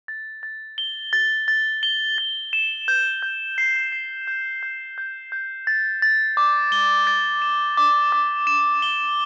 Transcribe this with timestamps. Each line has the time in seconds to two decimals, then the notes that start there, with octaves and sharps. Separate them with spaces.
0.08 A6
0.43 A6
0.78 G7
1.13 A6
1.48 A6
1.83 G7
2.18 A6
2.53 E7
2.88 G6
3.22 G6
3.58 C7
3.92 C7
4.27 G6
4.63 G6
4.98 G6
5.32 G6
5.67 A6
6.02 A6
6.37 D6
6.72 G7
7.07 A6
7.42 E7
7.77 D6
8.12 D6
8.47 E7
8.82 G7